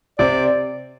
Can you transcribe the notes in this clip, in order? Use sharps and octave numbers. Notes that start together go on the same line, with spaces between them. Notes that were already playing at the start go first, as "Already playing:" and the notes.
C3 C4 D5